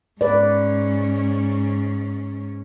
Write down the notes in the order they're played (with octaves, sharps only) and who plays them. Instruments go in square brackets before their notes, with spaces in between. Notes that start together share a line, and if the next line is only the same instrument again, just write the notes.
[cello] G#2 C#4 [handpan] B4 D5